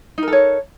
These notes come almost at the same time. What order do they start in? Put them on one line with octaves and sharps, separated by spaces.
D#4 A#4 A4 C#5